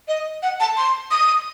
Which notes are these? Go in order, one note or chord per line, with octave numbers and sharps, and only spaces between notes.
D#5
F#5
A5
C6
D#6